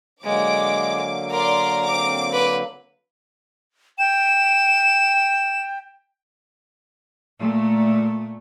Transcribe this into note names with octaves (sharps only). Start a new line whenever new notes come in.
D3 F#3 G#3 A#3 D6
A#4 D5 C6 D6
C4 D6
B4
G5 E7
A#2 A3